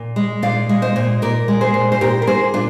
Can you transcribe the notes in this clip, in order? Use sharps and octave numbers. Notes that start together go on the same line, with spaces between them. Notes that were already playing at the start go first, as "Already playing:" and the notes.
Already playing: A#2
G#3
A#2 D5 F5
G#3
C5 D#5
A#2
A#2 A#4 D5
G#3
G#4 C5
A#2
C5
A#2 G4 A#4
A#4
A#3 G#4 C5
A#2 D4 F4